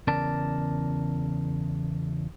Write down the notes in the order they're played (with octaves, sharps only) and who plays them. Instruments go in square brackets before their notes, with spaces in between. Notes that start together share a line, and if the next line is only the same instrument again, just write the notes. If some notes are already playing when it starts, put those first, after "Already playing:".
[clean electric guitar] E2 C#3 A#4 D5 A5